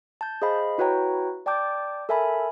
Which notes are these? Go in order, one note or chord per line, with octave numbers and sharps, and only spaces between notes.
A5 G6
G#4 C5 D#5 F5 B5
E4 F#4 B4 C#5 G5 A#5
D5 G5 A5 D6 G6
A4 A#4 E5 G#5 A5 B5